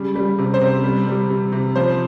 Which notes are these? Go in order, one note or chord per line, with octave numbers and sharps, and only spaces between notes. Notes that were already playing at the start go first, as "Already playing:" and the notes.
Already playing: C#3 G3
G3
C3
C5
C3
G3
G3
C3
C3
F3 C5